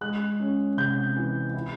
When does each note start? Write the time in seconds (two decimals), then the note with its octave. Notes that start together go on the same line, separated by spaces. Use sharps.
0.01 G#3 F#6
0.40 C#4
0.77 C3 G6
1.16 E3
1.54 E4